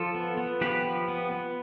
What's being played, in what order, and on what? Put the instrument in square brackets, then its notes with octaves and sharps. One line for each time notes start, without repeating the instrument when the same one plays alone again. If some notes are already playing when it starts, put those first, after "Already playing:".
Already playing: [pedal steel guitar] F3 F4 A4
B3
B3
F3 G4 B4
F3
B3
B3